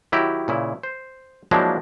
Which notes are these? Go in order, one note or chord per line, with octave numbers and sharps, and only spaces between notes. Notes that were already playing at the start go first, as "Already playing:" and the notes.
D#3 F#3 E4 G4 A#5
A#2 C#3 E4
C5
F3 F#3 G#3 A#3 D4 E4